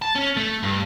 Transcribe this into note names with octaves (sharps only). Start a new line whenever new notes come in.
A5
C#4
A3
G2